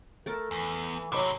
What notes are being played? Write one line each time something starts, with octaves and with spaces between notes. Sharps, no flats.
A3 A4 A#4 A5
E2 E3
A2 C3 F#3 C#5 B5 D6